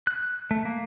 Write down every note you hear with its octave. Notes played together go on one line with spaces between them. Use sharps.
F#6
A3
A#3